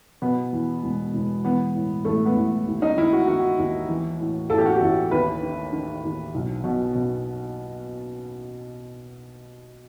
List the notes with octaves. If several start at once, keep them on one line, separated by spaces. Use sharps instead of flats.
B2 B3
E2
E1
E1
E3 B3
A2
A1 A3
B3
A1
D#2
D#4
D#3 E4
F#4
D#3 F#4
D#2
E3
A2
A1 A4
G4
F#4
G4
A1
D#2 B4
D#3
D#3
D#2
B1
B2
B2